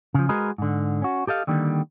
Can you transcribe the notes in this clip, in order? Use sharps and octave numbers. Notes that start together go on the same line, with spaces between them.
C#3 F3
G#3 F#4 G#4 A#4 B4 D#5
G#2 D3
C#4 F#4
G4 A4 D#5 F5
D3 D#3 G3 A#3